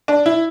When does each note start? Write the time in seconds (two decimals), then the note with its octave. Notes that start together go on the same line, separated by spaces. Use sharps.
0.08 D4
0.26 E4